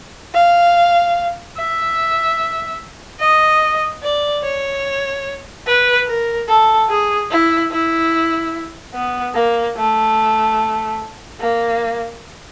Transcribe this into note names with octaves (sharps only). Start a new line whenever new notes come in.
F5
E5
D#5
D5
C#5
B4
A#4
A4
G#4
E4
E4
B3
A#3
A3
A#3